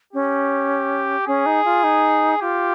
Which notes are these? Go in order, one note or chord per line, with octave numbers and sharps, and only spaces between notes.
C#4 G4
C#4 G#4
D#4
F4
D#4
F4 G4